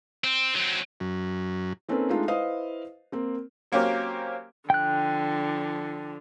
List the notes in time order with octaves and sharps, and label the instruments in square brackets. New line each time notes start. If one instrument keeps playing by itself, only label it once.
[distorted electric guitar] C4
F#3 C4
[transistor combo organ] F#2
[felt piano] A#3 C4 C#4 D#4 A4 B4
G#3 A3 D4 D#4 F4
E4 B4 C5 D#5 F5 D#6
A#3 C4
[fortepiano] F#3 A#3 C4 C#4 G4 A#4
[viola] D3 F3 [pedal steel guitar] G5 F#6